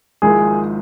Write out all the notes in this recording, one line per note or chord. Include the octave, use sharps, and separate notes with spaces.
G#1 G#2 F3 A#3 E4 G#4